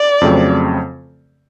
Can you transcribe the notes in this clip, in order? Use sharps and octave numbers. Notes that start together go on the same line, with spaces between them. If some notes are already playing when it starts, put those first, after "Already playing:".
Already playing: D5
F2 C#3 F#3 A3 C4